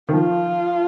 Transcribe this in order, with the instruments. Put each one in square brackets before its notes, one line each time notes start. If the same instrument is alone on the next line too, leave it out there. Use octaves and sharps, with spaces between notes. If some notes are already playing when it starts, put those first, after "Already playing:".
[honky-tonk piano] D#3
[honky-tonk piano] F3 [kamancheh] F4